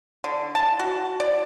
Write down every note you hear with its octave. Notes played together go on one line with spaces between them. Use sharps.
D3
A5
F#4
D5